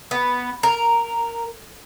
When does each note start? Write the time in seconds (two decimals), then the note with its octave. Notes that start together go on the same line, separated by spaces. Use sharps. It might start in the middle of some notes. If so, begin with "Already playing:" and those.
0.11 B3
0.63 A#4